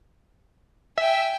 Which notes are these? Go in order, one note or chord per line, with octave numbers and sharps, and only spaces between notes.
E5 G5 G#5